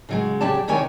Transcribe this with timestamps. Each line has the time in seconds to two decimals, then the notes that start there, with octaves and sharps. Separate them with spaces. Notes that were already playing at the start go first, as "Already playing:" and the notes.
0.09 C#3 F#3 G#3
0.41 C#3 F#3 G4 G#4 D5 A5
0.68 C3 D#3 C#5 D5 G#5